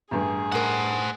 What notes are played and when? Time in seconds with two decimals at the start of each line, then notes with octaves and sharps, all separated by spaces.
0.11 A1 G2 G#4
0.52 A2 A#4 C5 F#5